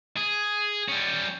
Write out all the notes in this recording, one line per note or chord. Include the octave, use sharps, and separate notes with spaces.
G#4
G3 C#4